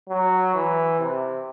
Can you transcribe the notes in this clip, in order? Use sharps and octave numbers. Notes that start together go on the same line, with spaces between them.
F#3
E3
C3